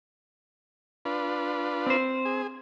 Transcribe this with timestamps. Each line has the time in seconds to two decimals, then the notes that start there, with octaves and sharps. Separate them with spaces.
1.05 D4 F4 B4
1.87 C4 C5
2.25 G#4